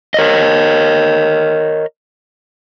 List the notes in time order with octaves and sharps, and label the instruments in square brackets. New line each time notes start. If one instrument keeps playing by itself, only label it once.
[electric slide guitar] A#4 C#5 D#5